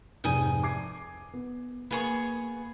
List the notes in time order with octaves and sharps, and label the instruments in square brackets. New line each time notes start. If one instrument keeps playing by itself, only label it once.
[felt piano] F1 G#2 [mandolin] G#5 D#6 G6
[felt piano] D6 G#6 C7
B3
[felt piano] A#3 [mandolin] B3 G#4 C#6